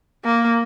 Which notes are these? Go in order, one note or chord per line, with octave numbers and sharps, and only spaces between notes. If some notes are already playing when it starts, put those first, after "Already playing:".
A#3